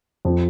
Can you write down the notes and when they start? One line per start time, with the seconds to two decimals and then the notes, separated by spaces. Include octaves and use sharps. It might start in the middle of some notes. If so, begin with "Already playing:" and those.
0.25 F2 F3